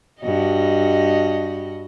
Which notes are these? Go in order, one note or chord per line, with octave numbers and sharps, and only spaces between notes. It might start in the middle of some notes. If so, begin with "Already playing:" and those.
G2 F#4 D#5